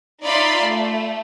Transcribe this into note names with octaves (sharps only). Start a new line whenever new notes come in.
D#4 F4 D5 E5 B5 C6
A3